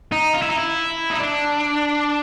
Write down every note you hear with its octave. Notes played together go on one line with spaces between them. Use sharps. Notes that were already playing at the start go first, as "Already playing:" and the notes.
D#4
F4
E4
D#4
E4
D#4
D4